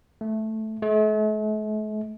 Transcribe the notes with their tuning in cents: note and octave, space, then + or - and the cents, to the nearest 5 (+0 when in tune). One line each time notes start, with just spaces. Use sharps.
A3 -5
A3 -45